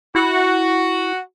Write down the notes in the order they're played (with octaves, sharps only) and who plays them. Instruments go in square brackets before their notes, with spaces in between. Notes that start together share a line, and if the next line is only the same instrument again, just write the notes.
[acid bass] E4 [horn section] F#4